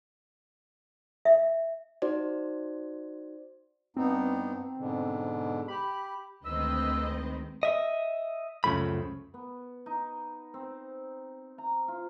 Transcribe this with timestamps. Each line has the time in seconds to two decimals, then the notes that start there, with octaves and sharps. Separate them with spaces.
1.25 E5
2.02 D#4 F#4 C5 D5
3.97 G2 B3 C4 D#4
4.77 G#2 B2 D3
5.68 G4 B5
6.45 D2 D#3 G#3 C4 B4 D#5 E6
7.63 D#5 E5
8.64 C#2 F#2 C#3 F3 A3 B5
9.34 B3
9.86 D#4
10.54 C4
11.58 A#5
11.88 F4